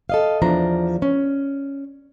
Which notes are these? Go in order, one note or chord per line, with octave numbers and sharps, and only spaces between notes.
A4 D#5 F5
E2 F3 D4 A#5
C#4